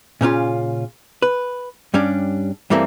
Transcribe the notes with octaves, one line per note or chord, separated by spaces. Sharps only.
A#2 C#3 C#4 F4
B4
G2 G3 C#4 D4
G2 E3 G3 A3 A#3 C4